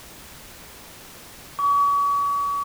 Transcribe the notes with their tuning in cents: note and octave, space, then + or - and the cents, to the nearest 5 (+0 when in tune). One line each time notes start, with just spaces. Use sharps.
C#6 +40